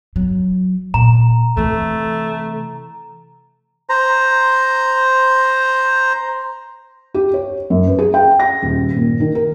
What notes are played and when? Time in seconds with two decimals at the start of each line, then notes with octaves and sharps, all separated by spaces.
0.16 F#3
0.94 A#2 A#5
1.57 C3 E3 A3
3.90 C5 A#5
7.14 G4
7.34 C#5
7.70 F#2
7.87 B4
7.99 G#4
8.14 G5
8.40 A#6
8.62 D#1
8.96 A#2
9.20 D#3
9.35 A#4